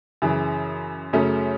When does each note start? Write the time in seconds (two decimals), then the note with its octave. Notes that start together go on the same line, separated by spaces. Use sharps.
0.22 F#2 C#3 E3
1.13 F#2 C#3 F#3 A3 C#4